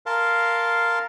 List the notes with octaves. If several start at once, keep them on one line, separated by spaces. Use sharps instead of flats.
A#4 F5 A5 C6